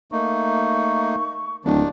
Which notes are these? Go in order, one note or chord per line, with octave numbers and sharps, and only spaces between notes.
A3 A#3 D#4 C#6
D1 D#2 D#3 D4